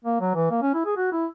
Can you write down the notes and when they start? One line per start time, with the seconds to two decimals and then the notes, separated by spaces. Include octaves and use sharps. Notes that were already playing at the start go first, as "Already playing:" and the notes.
0.04 A#3
0.20 F#3
0.35 E3
0.51 A#3
0.62 C#4
0.74 E4
0.85 G#4
0.97 F#4
1.12 E4